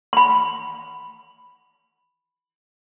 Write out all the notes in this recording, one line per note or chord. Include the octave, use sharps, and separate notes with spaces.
B5 C6